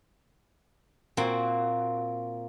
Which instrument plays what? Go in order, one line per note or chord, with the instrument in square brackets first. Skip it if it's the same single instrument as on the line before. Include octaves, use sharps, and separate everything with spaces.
[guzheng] A#2 A#3 C4 F#4